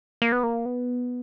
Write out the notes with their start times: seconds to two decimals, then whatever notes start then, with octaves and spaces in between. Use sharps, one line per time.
0.22 A#3
0.32 B3
0.43 A#3
0.66 B3